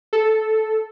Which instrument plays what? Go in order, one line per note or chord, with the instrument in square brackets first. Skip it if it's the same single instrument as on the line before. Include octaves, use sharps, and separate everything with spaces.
[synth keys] A4